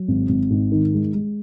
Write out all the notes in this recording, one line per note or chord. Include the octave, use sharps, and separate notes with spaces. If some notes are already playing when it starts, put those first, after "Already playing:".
Already playing: F#3
G#1
G#1
G#2
D#3
G#3
G#3